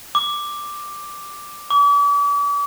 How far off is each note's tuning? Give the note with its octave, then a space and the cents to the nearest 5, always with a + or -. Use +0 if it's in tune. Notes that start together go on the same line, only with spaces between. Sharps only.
D6 +5
D6 -40